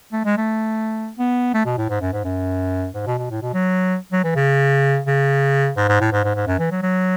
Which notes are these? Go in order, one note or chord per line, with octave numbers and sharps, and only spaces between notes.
A3
G#3
A3
B3
A3
B2
A2
G#2
F#2
G#2
F#2
G#2
B2
B2
A2
B2
F#3
F#3
E3
C#3
C#3
G#2
G#2
A2
G#2
G#2
G#2
F#2
E3
F#3
F#3